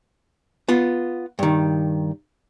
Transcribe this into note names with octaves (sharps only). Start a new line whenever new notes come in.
B3 F4
G2 D#3